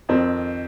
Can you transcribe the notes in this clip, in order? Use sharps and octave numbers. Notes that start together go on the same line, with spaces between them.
F2 D#3 C4